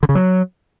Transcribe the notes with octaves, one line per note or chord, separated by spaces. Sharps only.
D3
C#3
F#3